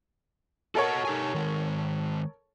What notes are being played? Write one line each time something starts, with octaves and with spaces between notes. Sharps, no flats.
F#4 A4 A#4 C#5 D#5 F#5
D#4 G4 G#5
D#3 G#3